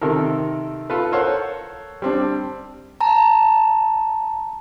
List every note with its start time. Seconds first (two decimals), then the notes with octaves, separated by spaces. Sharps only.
0.01 C3 D#3 A4 A#4
0.90 F4 A4 B4
1.12 A4 A#4 C5 C#5 F5 F#5
2.02 G3 C4 D4
3.01 A5 A#5